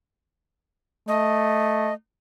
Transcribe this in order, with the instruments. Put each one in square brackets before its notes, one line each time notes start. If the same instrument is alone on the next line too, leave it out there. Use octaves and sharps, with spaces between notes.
[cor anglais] A3 [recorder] D#5